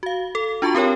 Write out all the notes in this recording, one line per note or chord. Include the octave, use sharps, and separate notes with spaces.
F#4 F5
A4
D4 F4 F#4 A5 C#6
C4 G4 A#4 C#5 G5